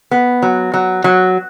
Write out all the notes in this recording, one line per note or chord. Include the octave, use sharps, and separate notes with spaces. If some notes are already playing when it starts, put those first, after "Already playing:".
B3
F#3
F#3
F#3